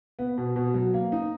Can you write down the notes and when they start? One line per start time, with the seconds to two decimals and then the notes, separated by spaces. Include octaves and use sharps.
0.19 B3
0.38 B2
0.56 B2
0.74 F#3
0.94 A#3
1.12 D#4